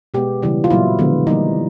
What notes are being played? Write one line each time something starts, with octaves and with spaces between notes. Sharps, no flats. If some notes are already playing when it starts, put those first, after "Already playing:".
B2 G#3 B3 G4
C#3 E3 G3
F4
A#2 F#3 A#3 E4
D3 F3 G#3 B3
E3 G3 A#3 D#4